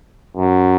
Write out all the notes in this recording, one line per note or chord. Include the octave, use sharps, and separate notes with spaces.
F#2